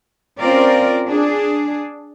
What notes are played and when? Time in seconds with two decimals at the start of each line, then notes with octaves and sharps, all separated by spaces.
0.39 C4 C#4 F4 A#4 D5
1.07 D4 G#4